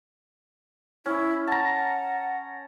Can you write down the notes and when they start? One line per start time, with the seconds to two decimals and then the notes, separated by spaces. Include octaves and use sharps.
1.06 C#4 E4
1.47 F#5 A5 A#5